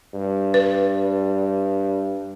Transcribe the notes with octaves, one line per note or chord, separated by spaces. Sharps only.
G2
B4